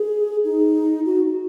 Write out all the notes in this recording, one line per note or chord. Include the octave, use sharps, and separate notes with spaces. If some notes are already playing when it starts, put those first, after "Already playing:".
Already playing: G#4
D#4
F#4